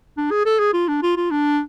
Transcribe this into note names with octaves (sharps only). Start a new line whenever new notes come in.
D4
G#4
A4
G#4
F4
D4
F4
F4
D4